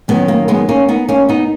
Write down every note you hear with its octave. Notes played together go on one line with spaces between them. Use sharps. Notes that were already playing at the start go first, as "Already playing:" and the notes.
F#2 D#3 F#3 G#3 B3
A#3
G#3 B3
A#3 C#4
B3 D#4
A#3 C#4
B3 D#4